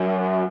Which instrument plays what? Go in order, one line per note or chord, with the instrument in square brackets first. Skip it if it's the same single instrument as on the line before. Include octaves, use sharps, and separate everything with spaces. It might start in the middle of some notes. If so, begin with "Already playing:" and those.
Already playing: [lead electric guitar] F#2